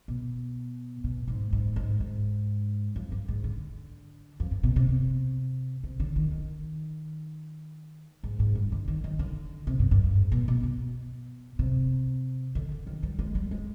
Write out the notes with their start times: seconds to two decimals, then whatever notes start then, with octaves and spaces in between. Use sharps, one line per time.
0.08 B2
1.04 B2
1.28 G#2
1.53 G#2
1.76 G#2
2.00 G#2
2.96 F2
3.12 G2
3.28 G#2
3.44 D3
4.40 F2
4.51 G2
4.63 B2
4.76 C3
4.88 C3
5.84 C3
6.00 D3
6.16 D#3
6.31 D#3
8.23 G#2
8.39 G#2
8.55 G2
8.72 D3
8.88 D#3
9.04 D#3
9.19 D3
9.67 C3
9.79 G2
9.91 G2
10.04 G2
10.16 G#2
10.32 B2
10.48 B2
10.63 B2
11.59 C3
12.55 D3
12.71 D3
12.87 D#3
13.03 G3
13.19 G#3
13.35 G3
13.51 G#3